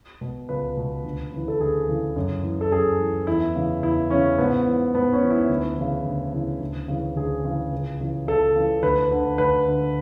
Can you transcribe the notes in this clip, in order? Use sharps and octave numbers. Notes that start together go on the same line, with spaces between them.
B2
C#2 B4
B2
D2
C#3 E3
A4
D2 G#4
C#3 E3
F#2
E3
A4
F#2 G#4
E3
E2 E4
C#3 E3
E2 E4
C#3 E3 C#4
G#2 B3
E3
G#2 B3
C#4
E3
E4
D2
C#3 E3
D2
C#3 E3
D2
C#3 E3
D2 G#4
C#3 E3
C#2
C#3 E3
C#2 A4
C#3 E3
D2 B4
D3
D2 B4
D3